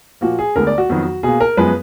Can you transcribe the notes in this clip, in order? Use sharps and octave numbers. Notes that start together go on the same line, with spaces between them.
A#2 F3 A#3 F#4
G#4
D2 D3 G#3 B3 A#4
D5
F#4
F2 D#3 F#3 B3
B2 A#3 G#4
A#4
F#2 F3 G#3 B3 B4